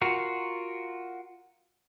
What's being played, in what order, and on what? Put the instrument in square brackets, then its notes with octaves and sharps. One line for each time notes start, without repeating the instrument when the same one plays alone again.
[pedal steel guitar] F4 F#4 A#4